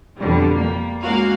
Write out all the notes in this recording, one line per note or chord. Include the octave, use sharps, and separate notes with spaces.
F2 B2 D3 G3
G3 A#3
G#3 A#3 C#4 F#4 A#4 F5